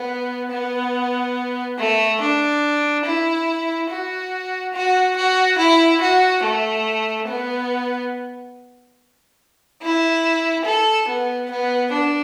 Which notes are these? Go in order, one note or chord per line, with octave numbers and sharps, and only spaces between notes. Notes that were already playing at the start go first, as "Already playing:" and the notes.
Already playing: B3
B3
A3
D4
E4
F#4
F#4
F#4
E4
F#4
A3
B3
E4
A4
B3
B3
D4